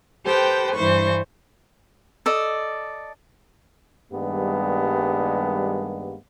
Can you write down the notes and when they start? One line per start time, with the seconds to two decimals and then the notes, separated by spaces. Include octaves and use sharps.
0.24 G4 A4 B4 C5 G5
0.75 G2 E3 C5 C#6
2.26 A4 D5 D#5
4.12 G2 D#3 G3 G#3 A#3 B3